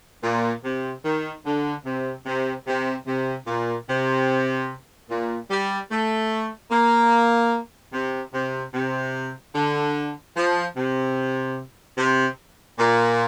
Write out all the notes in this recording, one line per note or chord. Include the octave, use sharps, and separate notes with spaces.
A#2
C3
D#3
D3
C3
C3
C3
C3
A#2
C3
A#2
G3
A3
A#3
C3
C3
C3
D3
F3
C3
C3
A#2